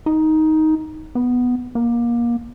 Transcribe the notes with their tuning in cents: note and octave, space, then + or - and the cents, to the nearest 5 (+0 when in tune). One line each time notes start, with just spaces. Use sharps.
D#4 +10
B3 +0
A#3 +25